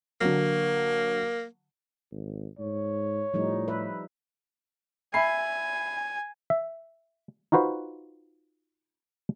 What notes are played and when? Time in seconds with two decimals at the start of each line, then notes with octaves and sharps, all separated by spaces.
0.21 D3 F#3 A#3
2.12 G#1
2.59 G#2 C#5
3.34 A2 F3 G3 D#4
3.68 B4 E5
5.14 E5 G#5 B5 C7
6.50 E5
7.52 D#4 F4 F#4 B4 C5